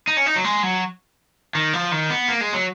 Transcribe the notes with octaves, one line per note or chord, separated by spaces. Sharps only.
D#4
C#4
D#4
F#3
G#3
F#3
D#3
F3
D#3
B3
A#3
G#3
F#3